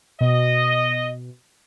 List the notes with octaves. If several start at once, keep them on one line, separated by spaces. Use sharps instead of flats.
B2 D#5